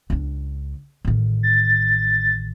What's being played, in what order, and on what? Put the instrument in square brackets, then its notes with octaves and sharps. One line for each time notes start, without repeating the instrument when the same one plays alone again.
[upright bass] C#2 D4
A1 D#3
[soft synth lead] A6